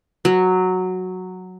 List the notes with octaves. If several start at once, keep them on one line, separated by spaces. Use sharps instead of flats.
F#3